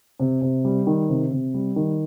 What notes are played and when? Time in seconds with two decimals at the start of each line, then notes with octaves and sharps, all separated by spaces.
0.20 C3
0.42 C3
0.65 G3
0.87 D#3
1.09 C3
1.32 C3
1.54 G3
1.76 D#3